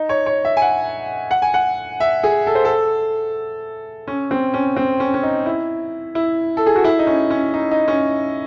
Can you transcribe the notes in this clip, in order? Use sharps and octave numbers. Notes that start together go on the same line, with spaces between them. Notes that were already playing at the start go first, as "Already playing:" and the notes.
Already playing: D#4
C#5
C#5
E5
G#5
F#5
F#5
G#5
F#5
E5
G#4
A4
C5
A4
C#4
C4
C#4
C4
C#4
C#4
D#4
E4
E4
A4
G#4
F#4
E4
D#4
C#4
C#4
D#4
D#4
C#4